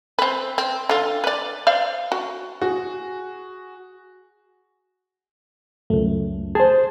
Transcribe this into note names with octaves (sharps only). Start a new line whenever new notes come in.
C4 B4
C4
D3 F4
B4 D5
C5 D5 F5
F#4
F#4 G#4
C#2 F#2 A3
G#4 C5 A5